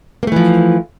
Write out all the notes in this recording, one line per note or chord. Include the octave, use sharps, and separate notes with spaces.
E3 F3 A3 A#3